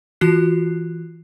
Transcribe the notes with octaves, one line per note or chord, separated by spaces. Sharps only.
E3 F4 F#4 F#6 C7